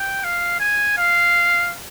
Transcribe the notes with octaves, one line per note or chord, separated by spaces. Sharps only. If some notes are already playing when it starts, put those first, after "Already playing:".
Already playing: G5
F5
G#5
F5